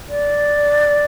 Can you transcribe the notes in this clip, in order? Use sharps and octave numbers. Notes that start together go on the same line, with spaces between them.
D5